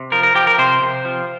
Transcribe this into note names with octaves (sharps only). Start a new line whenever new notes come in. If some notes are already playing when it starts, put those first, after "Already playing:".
Already playing: C3
F3 A#4
A#4
F3 G4
A#4
C3 C5
C3
F3